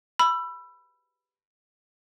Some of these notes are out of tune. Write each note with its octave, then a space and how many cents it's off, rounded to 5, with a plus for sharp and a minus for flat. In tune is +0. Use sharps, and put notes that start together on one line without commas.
B5 +0 E6 +25